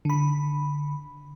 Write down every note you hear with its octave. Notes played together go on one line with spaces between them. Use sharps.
D3 B5